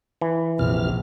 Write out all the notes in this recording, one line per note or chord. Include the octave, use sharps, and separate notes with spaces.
E3
A#1 F2 C3 F6